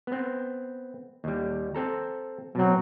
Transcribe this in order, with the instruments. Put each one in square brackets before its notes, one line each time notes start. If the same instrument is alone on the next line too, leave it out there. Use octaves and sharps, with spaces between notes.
[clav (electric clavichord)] B3 C4
D#2 G3
C4 A4 A#5
[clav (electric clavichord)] B2 C4 [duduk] F#3